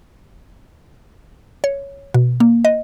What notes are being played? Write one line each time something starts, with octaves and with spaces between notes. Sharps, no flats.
C#5
B2
A#3
D#5